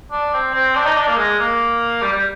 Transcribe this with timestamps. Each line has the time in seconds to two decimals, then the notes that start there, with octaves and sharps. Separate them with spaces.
0.11 D4
0.34 C4
0.54 C4
0.75 D4
0.86 D#4
0.97 D4
1.07 A#3
1.17 G#3
1.39 A#3
2.02 G3
2.13 G3